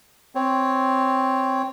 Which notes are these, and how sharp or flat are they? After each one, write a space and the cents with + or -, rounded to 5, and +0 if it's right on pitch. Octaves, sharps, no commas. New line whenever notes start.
C4 +0 C#5 +0